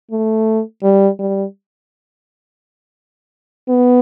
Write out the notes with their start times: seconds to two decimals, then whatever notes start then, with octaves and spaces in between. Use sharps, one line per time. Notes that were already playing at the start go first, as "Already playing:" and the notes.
0.11 A3
0.83 G3
1.19 G3
3.69 B3